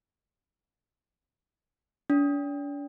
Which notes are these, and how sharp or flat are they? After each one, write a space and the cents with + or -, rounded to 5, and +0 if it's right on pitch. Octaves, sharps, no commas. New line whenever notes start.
D4 -45